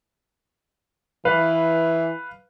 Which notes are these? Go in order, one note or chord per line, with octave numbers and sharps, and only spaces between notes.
E3 B4 F5